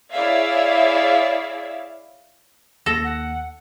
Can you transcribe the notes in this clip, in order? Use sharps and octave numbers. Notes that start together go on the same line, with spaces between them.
E4 G#4 C#5 D5 E5 F5
D#2 A4 A#6
F#5